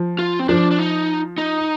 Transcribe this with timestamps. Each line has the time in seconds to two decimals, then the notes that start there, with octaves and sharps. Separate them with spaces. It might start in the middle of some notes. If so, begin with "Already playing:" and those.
Already playing: F3
0.19 F4
0.40 C4
0.49 F3 D4
0.71 D4
0.79 D#4
1.38 D#4